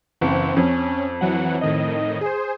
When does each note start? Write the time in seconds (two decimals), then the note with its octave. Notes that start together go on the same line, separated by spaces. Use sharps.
0.21 F#1 E3 C4
0.56 F2 C#4
1.21 E3 F#3 F#5
1.61 A2 D#3 D#5
2.21 G#4 C5